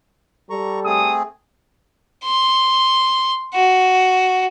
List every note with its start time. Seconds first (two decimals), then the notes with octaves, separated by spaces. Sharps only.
0.50 G3 A4 A#5 C#6
0.85 A3 C4 G#4 D#6
2.25 C6
3.54 F#4